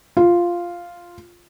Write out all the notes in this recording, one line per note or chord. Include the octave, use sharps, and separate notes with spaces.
F4